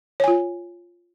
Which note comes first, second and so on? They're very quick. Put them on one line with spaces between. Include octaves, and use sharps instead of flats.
C#5 G#5 F4